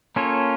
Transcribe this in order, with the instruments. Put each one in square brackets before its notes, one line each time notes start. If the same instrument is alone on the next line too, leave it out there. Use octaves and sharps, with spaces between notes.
[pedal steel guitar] A#3 C#4 F4 A4 C#5